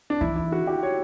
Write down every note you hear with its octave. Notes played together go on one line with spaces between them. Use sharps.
D4
E3 E4
E4
F#4
G4
C#5